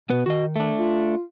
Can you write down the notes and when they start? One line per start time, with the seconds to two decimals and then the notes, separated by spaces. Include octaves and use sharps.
0.10 B2 B3 B4
0.26 D#3 F#4 D#5
0.56 A3 D4
0.78 F4